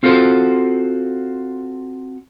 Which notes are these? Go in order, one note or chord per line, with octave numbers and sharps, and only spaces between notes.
C4 F4 F#4 A4 C5